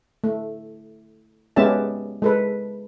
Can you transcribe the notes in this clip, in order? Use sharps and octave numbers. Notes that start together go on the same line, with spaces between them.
A3
G#3 B3 C#4 G4 E5 A5
G#3 A4 B4